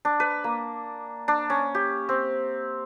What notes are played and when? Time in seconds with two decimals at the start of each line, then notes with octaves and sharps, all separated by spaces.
0.05 D4
0.20 B4
0.44 A#3
1.28 D4
1.50 C#4
1.75 G4
2.09 C4